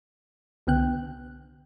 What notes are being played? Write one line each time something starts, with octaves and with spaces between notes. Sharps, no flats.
C2 D3 B3 G5 F#6